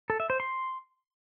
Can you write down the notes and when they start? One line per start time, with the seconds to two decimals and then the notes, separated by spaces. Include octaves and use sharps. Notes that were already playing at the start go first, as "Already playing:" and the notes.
0.10 A4
0.20 E5
0.30 C5
0.40 C6